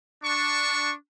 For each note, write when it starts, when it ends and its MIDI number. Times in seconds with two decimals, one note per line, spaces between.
0.23 0.92 62
0.23 0.92 85